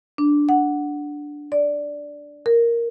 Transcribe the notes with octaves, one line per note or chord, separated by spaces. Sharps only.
D4
F#5
D5
A#4